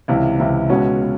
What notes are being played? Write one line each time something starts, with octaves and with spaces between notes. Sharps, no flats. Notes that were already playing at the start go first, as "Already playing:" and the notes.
C#2 C3 E3
C#2 C3 E3
C#2 B2 G#3 C#4 F#4
B2